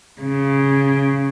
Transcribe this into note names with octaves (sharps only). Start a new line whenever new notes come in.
C#3